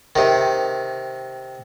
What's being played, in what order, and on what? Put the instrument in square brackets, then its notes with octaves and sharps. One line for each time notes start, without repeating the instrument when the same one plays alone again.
[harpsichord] C3 D#3